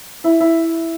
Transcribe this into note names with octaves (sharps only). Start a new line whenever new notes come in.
E4
E4